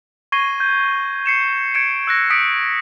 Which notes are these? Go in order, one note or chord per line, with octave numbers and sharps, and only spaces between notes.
C#6 G#6 A#6 C7 D#7 G7
G6
C7 C#7 E7
G#6 C#7 D7 E7
E6 F#6 A#6
D#6 B6 C#7 D7